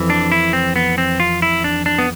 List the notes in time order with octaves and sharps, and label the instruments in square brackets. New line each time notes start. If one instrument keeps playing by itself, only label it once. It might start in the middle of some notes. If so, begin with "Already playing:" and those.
Already playing: [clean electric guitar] F2 E3
D4
E4
C4
B3
C4
F4
E4
D4
D4
B3